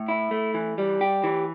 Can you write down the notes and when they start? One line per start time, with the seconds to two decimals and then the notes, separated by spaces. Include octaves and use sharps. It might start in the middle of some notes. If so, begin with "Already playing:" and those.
Already playing: A2
0.08 E4
0.31 A3
0.54 E3
0.78 G3
1.01 G4
1.24 E3